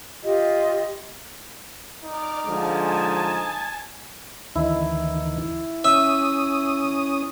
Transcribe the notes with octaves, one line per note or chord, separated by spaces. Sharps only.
F4 G4 D#5
D#4 D5 D6 F6
D3 F3 G#3 G#5 A5
D2 D#3 E3 E4
C#4 E5 D#6